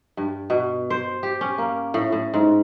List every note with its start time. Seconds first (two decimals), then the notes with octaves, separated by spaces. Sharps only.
0.17 G2
0.50 B2
0.90 C5
1.23 G4
1.41 C#4
1.58 A#3
1.94 A2
2.12 A2
2.34 G#2